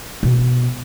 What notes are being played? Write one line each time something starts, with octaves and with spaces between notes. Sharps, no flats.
B2